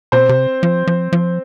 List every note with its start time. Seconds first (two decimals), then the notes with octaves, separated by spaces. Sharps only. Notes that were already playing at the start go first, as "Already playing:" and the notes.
0.12 B2 C4 C5
0.29 C3
0.63 F3
0.87 F3
1.13 F3